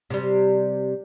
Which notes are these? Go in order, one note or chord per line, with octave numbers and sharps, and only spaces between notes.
C3 G3